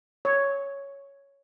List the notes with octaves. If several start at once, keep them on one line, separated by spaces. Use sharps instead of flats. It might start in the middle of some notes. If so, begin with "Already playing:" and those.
C#5